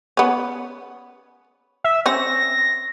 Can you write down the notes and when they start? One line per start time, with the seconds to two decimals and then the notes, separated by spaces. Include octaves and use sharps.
0.17 B3 C#4
1.84 E5
2.06 C4 C#4 A#6